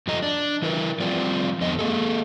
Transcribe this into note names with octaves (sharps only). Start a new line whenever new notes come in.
F2 F3 A4 D#5 A#5
D4
E3 E4 A#4 B4
F3 G3 C4 F4 D5
F2 D3 B3 D#5
A#3 G#4 A4